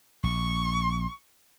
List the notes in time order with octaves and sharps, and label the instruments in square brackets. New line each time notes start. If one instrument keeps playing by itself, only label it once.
[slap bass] A#1 [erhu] C#6